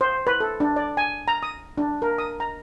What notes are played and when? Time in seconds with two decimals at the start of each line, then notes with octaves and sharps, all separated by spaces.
0.01 C5
0.27 B4
0.40 A4
0.60 D4
0.76 D5
0.97 G#5
1.28 A#5
1.43 D#6
1.78 D4
2.02 A#4
2.18 D#6
2.40 A#5